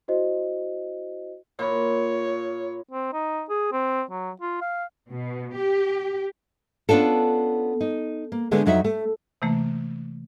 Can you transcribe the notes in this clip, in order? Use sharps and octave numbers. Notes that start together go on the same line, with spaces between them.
E4 F#4 C5 D#5
A#2 C#5 B5 D6
C4
D#4
G#4
C4
F#3
F4
F5
B2
G4
B3 C#4 D4 F4 A4
D#4
A#3
D3 G#3 A3 B3
F2 F#3 D#4 F#4 E5
A3
C3 E3 A3 A#3